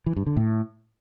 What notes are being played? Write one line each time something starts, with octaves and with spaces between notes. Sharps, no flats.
E3
G2
D3
A2